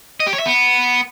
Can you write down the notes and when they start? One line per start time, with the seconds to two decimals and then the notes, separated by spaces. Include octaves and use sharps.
0.20 D#5
0.27 G4
0.33 C#5
0.39 E5
0.46 B3